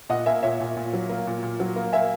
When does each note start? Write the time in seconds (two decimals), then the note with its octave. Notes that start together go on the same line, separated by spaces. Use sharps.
0.09 A#2 D#5 F#5
0.26 A#3 E5 G#5
0.43 A#2 C#5 E5
0.60 A#2
0.76 A#2
0.93 F#3
1.09 A#3
1.27 A#2
1.43 A#2
1.60 F#3
1.76 A#3
1.93 A#3 E5 G#5